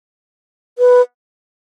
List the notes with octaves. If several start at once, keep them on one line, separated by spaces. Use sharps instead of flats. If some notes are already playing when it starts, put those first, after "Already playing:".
B4